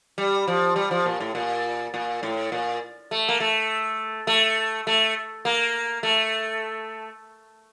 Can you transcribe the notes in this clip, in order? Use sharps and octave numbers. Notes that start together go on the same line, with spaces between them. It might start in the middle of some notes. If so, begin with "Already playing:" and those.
G3
F3
G3
F3
A#2
A2
A#2
A#2
A2
A#2
A3
A#3
A3
A3
A3
A#3
A3